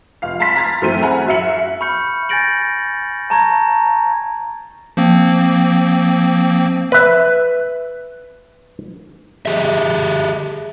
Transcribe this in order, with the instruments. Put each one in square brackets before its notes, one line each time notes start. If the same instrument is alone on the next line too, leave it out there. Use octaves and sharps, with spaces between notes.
[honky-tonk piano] F1 F5 C7
F5 G#5 A5 B5 C6 B6
A#5 C6 F6 G#6 A6
F#2 E3 A3 C4 G5 D#7
G#4 F#5 G#5 A#5 B5 F6
F#2 F#4 E5 F5 C#7 F#7
[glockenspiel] B5 C#6 F6 G6 C#7
G#5 G6 A6 A#6 D7 F#7
A5 A#5 C#6 G#6 A#6
[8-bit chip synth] F3 A#3 C4
[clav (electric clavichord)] B4 E5
[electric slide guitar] G4 G#4 E5